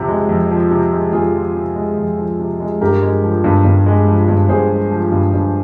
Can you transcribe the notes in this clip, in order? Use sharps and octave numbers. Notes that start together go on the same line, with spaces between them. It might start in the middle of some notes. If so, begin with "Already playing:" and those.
Already playing: F2 C3 F3
G#3
F2
F3
C3
G#3
F2 F4 G#4
F3
C3
G#3
F2
F3
C3
G#3
G2 G4 A#4
G#3
F3
G2
G2
G#3
F3
G2
G2 G#4 C5
G#3
F3
G2
G2